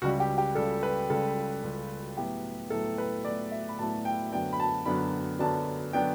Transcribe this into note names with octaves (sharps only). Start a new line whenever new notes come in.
C#2 C#3 G3 F#4
G4
G4
C#2 C#3 G3 A4
B4
C#2 C#3 G3 A4
C#2 C#3 G3
A2 F#3 B3 E4 G4
A2 F#3 B3 E4 A4
B4
A2 F#3 B3 E4 D5
E5
B5
A2 F#3 B3 E4 A5
G5
F#2 D3 F#3 B3 D4 G5
B5
A5
F#2 D3 F#3 B3 D4 B5
F#2 D3 F#3 B3 D4 A5
D3 F#3 B3 D4 G5